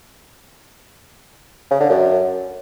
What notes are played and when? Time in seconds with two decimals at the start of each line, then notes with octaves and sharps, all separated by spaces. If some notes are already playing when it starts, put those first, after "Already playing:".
1.71 C#3
1.80 D3
1.89 F#2